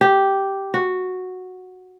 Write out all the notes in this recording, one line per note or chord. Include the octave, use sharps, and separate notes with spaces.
G4
F#4